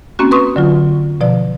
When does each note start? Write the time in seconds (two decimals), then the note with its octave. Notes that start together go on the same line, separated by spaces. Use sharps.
0.19 A#3 C4 C#4 F#4
0.31 B4 C6 C#6 D#6
0.56 D3 F#3 F4
1.21 B2 F3 D5